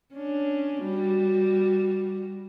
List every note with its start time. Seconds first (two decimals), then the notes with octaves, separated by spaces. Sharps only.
0.13 C#4 D4
0.82 G3 F#4